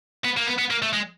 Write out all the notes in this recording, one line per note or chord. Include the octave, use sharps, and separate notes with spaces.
B3
A#3
B3
B3
A#3
A3
G#3